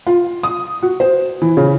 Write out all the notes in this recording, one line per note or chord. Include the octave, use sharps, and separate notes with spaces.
F4
D#6
F#4
C5
E3
C#3